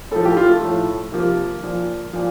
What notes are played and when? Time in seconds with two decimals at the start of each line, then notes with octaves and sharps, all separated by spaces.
0.11 A2 A4
0.16 F3
0.25 G4
0.37 F4
0.49 A3
0.62 A2 F3
1.12 C3 F3 A#3
1.63 A#2 F3
2.13 A#2 F3